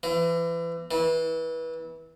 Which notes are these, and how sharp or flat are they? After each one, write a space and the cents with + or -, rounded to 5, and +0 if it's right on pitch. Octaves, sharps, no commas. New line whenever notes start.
E3 +30
E3 -25